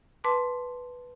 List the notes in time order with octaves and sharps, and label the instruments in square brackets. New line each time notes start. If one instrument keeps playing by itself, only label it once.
[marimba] B4 A5 C6 D6